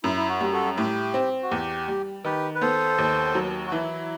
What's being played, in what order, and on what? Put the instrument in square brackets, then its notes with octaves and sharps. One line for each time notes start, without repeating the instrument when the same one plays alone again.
[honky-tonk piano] F#2 [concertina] E4
[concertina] E4
F#4
[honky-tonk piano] G3
[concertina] F#4 A4
[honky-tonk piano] A2 [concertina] G4
[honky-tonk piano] C4
[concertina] F#4
[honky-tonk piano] E2 [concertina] G4
[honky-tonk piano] G3
[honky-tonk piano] D#3 [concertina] G4 B4
[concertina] B4
[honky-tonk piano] B3 [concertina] A4 C5
[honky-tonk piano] D#2
F#3
[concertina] F#4
[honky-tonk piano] E3 [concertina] E4